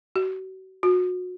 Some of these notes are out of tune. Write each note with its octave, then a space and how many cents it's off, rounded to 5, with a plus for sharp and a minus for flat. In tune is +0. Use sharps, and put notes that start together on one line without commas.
F#4 +35
F#4 -30